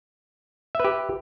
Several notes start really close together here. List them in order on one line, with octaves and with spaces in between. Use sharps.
E5 B4 G4